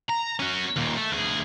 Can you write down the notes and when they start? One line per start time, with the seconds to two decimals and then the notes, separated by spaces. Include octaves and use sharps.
0.09 A#5
0.40 C#4 F#4
0.76 D#2 A#2
0.96 A3
1.12 D2 G#4